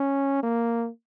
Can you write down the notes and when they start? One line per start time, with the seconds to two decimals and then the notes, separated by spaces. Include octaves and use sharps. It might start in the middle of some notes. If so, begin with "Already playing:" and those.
Already playing: C#4
0.43 A#3